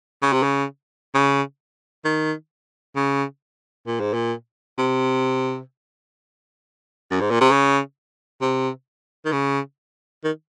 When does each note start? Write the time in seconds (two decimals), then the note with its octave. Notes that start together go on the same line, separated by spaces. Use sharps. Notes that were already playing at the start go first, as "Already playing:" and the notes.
0.22 C#3
0.33 C3
0.43 C#3
1.15 C#3
2.05 D#3
2.96 C#3
3.87 A#2
4.00 G#2
4.14 A#2
4.78 C3
7.11 F#2
7.21 G#2
7.31 A#2
7.41 C3
7.51 C#3
8.42 C3
9.25 D#3
9.32 C#3
10.24 D#3